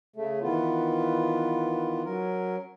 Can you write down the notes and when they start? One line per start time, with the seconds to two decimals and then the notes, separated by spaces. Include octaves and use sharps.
0.16 C#3 A3
0.42 D#3 E3 B3 F4
2.05 F#3 C#4 A#4